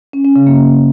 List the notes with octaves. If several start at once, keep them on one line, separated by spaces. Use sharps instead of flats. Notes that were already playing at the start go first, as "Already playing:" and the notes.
C#4
C#4
C#3
A#3